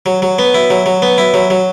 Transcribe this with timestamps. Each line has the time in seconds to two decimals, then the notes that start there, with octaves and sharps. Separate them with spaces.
0.06 F#3
0.22 F#3
0.39 B3
0.54 E4
0.70 F#3
0.86 F#3
1.02 B3
1.18 E4
1.34 F#3
1.50 F#3